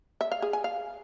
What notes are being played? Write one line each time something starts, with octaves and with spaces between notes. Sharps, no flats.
E5
F5
G#4
G#5
F5